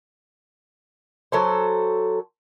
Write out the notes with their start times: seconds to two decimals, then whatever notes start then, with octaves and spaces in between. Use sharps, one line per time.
1.32 F#3 A4 C5